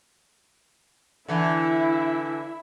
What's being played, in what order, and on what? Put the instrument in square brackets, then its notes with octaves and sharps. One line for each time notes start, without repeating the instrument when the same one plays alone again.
[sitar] D3 E3 [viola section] E4 E5